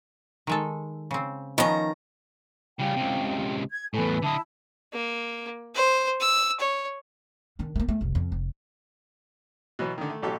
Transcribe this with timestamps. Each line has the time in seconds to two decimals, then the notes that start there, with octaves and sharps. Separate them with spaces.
0.47 D#3 G#3 A4
1.11 C#3 C4
1.58 D#3 F3 B3 C#4 A#5
2.79 C#3 G3 F5 G5
2.96 C#2 C3
3.71 G#6
3.94 E2 A2 A4 B4 G#5
4.22 D3 E4 D#5 A5
4.93 A#3
5.74 C5
6.20 E6
6.60 C#5
7.59 D#3 D4
7.76 A3 A#3
7.88 A3
8.01 F1 C2
8.15 F2
8.32 F1
9.79 B2 E3 F#3 B3
9.98 D3 D#3
10.10 A3
10.22 A1 B2 F#3 G4 A4